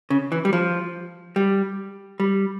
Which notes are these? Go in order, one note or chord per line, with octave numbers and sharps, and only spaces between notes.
C#3
E3
G3
F3
G3
G3